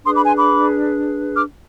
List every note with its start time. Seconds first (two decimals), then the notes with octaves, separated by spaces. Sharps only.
0.05 D4 G#4 B4 C6 D#6
0.15 B5 D6
0.26 G#5 C6
0.37 B5 D6
1.34 D6 F6